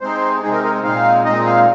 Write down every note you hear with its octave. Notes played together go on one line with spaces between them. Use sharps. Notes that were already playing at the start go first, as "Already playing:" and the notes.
C3 G#3 C4 D#4 C5
C3 G#3 C4 D#4 G#4
A#4
A#4
A#2 G#3 C4 D#4 F5
A#2 G#3 C4 D#4 D#5
F5